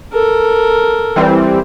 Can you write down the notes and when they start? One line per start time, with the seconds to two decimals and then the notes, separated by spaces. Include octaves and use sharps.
0.12 A4 A#4
1.16 E3 G3 C4